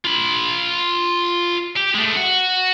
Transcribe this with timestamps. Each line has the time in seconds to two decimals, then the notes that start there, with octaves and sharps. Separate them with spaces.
0.05 F4 B5
1.76 G4
1.94 G#3 A3
2.16 F#4